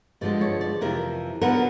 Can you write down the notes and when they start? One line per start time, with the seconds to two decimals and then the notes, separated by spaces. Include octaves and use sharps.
0.21 G2 D3 F3 G#3 D5
0.41 C#5
0.61 D5
0.81 F2 C3 E3 A#4
1.42 D3 F#3 B3 A#4